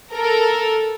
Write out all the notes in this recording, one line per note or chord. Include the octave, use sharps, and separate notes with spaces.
A4 A#4